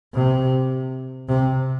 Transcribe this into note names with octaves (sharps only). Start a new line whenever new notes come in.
C3
C3